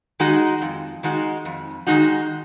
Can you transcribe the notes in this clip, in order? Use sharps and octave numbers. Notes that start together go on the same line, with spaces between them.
D#3 G#3 D#4 F#4
F2
D#3 G#3 D#4 F#4
F2
D#3 G#3 D#4 F#4